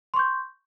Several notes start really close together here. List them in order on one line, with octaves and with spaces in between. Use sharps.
C6 C#6 G6